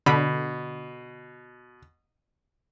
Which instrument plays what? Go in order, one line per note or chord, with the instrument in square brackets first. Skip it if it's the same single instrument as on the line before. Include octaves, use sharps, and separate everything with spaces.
[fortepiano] B2 [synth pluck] D3 B5